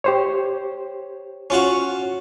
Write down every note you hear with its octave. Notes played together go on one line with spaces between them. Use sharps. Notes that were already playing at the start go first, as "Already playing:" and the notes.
G4 C5 C#5
C#4 F4 F#4